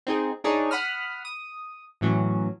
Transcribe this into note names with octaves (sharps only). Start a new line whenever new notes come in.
C4 D#4 G#4
D4 D#4 G#4 C#5 D#5
F#5 B5 D#6 F6
D#6
A2 E3 F#3 C#4